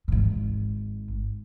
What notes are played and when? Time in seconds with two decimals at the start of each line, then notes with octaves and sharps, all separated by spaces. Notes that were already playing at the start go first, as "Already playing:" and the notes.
0.08 G#1 G#2